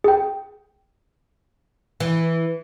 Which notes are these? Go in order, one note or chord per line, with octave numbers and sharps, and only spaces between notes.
G#4 G5
E3